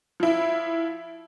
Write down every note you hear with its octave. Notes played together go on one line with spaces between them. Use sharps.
F3 E4